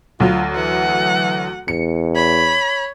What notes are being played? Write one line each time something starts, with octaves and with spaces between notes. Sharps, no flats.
D2 F#3 F4
E3 F#5
E2 C#7
C#5 B5